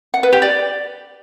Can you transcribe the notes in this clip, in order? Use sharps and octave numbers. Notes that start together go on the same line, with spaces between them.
F#5
B4
G4
D5